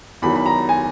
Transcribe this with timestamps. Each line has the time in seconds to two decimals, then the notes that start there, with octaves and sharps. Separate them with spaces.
0.22 E2 D#3 F#3 B5
0.36 B5
0.46 A#5
0.69 G#5